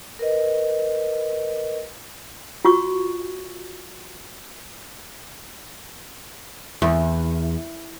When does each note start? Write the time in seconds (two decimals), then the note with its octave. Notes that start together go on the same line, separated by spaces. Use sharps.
0.19 A#4 B4 D#5
2.65 F4 F#4 C#6
6.82 E2